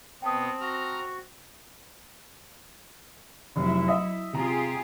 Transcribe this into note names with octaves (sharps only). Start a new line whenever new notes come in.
B2 B3 C4 G5 A5 D#6
F#4 A#5 F6
F1 F#3 E4
D#5 E5
C3 F4 G4 G#4 A#5